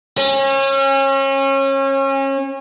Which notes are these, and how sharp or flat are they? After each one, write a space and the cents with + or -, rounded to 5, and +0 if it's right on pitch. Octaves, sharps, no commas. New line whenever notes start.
C#4 -30